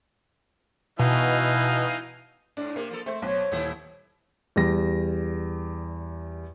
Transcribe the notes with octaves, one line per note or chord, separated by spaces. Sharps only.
B2 E3 D#4 F5
G#2 D4
C3 A#3
F3 A4
A3 C4 C5
B1 C#5
D#1 D#3 E4
E2 G3 A#6